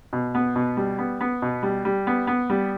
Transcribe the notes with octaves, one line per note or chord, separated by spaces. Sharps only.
B2
B3
B2
G3
B3
B3
B2
G3
G3
B3
B3
G3